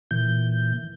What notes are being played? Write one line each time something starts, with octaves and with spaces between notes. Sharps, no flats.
A#2 E3 G6